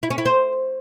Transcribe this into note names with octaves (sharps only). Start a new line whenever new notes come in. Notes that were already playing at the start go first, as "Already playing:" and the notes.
E4
C#4
E4
C5